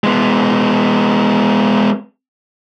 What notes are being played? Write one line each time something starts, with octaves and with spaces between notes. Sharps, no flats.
G#3 B3